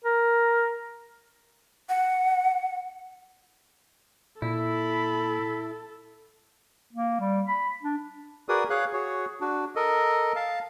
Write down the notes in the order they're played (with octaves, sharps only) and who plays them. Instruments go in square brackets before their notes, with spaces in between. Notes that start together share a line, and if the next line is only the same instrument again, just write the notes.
[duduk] A#4
[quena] F#5
[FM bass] A#2 [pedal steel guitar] E4 [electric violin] A4 [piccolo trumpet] B5
[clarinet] A#3
G3
B5
D4
[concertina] F#4 G#4 A#4 B4 D5 D#6
G#4 C#5 F5 F#6
F#4 G#4 C#5
D4 F#4
A4 A#4 D#5
F5 A5